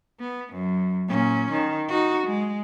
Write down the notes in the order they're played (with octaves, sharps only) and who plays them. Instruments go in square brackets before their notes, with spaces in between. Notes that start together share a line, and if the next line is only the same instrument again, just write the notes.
[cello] B3
F#2
A#2 C#4
D#3
D#4 F#4
G#3